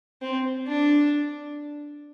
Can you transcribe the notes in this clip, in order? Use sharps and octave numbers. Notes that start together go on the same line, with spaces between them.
C4
D4